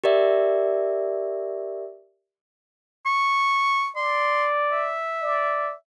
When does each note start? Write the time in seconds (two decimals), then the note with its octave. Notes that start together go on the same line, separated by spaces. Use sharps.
0.04 G4 A#4 D5 E5
3.06 C#6
3.96 D5 C6
4.72 E5
5.23 D5